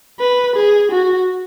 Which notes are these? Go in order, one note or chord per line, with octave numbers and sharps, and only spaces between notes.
B4
G#4
F#4